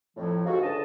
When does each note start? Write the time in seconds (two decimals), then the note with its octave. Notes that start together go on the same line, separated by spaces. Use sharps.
0.17 F2 A2 F3 F#3
0.46 G#2 C3 A3 F4 F#4
0.61 C#2 D3 D#5 A5